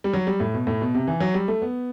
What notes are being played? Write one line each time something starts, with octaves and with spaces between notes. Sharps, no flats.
G3
F#3
G3
A2
B2
A2
B2
C3
E3
F#3
G3
A3
B3